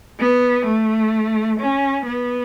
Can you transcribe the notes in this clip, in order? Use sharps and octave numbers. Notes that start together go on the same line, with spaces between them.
B3
A3
C#4
B3